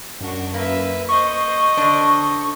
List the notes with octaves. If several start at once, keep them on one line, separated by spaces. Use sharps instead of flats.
F#2 D4 F#4
A#3 B4 E5
C5 D#5 C#6
D3 D4